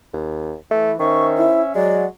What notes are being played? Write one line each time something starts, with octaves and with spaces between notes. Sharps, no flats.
D#2
E3 A3
D#3 C#4 C5 E5 C#6
E4
F#3 G#3 D5